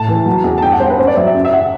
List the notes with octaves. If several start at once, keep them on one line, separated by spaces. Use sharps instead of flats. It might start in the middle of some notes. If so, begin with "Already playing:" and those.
Already playing: A2 A5
E3
F#3
E2
A5
G2 G5
F#5
G2 C5
B4
F#2 C5
D5
F#3 E5
E5
F#2
E5
F#5